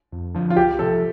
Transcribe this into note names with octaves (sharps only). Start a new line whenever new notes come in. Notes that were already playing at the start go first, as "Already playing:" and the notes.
F2
D3 F3 D4
F4
C2 G4
C3 F3 A4